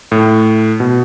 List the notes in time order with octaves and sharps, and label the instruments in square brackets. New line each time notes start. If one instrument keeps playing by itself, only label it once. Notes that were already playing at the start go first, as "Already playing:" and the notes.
[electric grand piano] A2
B2